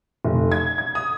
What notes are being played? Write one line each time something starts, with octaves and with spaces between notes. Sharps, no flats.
F1
G#6
G#6
D#6